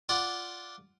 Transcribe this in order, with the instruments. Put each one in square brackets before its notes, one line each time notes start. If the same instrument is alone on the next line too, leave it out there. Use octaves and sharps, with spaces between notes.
[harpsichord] F4 D5 F#5